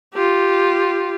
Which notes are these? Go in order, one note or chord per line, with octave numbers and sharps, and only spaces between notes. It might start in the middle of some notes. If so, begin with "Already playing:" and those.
F4 G4